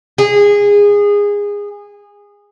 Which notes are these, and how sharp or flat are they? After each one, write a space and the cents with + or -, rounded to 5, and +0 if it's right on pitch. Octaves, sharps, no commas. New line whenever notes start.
G#4 -20